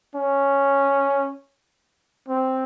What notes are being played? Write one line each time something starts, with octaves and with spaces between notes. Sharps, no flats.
C#4
C4